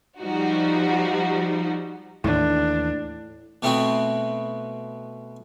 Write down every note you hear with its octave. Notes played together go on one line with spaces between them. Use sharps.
F3 G3 D#4 F#4
D#2 A2 E3 D4
B2 A3 B3 C4 E4 F#4